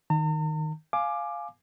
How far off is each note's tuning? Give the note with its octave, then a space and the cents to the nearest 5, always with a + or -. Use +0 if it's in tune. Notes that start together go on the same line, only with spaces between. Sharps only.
D#3 +0 A#5 -45
F5 +0 G#5 +20 D6 +15